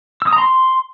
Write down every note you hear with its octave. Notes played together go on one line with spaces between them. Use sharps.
E6
D#6
A#5
C6